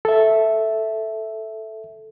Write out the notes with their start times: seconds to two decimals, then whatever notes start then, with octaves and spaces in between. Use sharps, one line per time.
0.05 A4 E5